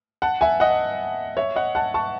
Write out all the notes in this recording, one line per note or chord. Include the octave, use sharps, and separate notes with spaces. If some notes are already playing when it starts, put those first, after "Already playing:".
F#5 A5
E5 G#5
D#5 F#5
C#5 E5
D#5 F#5
F#5 A5
A5 C#6